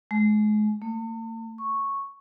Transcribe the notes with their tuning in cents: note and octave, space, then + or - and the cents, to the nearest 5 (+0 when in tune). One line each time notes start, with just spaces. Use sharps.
G#3 +35
A3 +45
C#6 -5